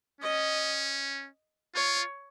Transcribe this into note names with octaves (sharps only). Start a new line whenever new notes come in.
C#4 D#5
F4 C#5